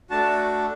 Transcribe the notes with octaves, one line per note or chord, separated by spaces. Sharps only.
A3 D4 F#4 A5